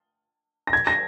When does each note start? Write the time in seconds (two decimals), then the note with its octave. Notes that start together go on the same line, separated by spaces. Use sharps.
0.67 A#6
0.73 G#6
0.87 A#6